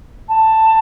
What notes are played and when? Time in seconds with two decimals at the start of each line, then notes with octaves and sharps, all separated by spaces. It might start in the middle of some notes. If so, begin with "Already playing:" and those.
0.29 A5